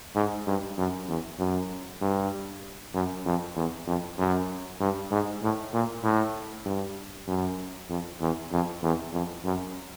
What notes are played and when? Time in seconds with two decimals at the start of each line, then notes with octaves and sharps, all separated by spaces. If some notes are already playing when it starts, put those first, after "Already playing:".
0.16 G#2
0.47 G2
0.78 F#2
1.08 E2
1.39 F#2
2.01 G2
2.94 F#2
3.26 F2
3.56 E2
3.87 F2
4.18 F#2
4.80 G2
5.11 G#2
5.42 A2
5.73 A#2
6.03 A2
6.66 G2
7.27 F#2
7.89 F2
8.21 E2
8.52 F2
8.83 E2
9.13 F2
9.44 F#2